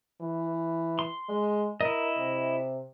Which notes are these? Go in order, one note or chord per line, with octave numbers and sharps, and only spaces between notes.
E3
C6
G#3
E4 A#4 D#5
C3